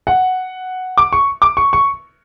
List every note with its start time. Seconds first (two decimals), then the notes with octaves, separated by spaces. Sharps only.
0.07 F#5
0.98 D6
1.13 C#6
1.42 D6
1.57 C#6
1.73 C#6